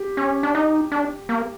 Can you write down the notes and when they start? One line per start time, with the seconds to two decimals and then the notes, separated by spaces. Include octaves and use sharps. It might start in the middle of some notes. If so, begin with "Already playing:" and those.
Already playing: G4
0.17 C#4
0.43 D4
0.55 D#4
0.92 D4
1.29 A#3